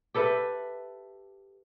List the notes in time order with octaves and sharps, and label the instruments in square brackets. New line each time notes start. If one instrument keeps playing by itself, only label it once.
[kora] G4 A4 B4 E5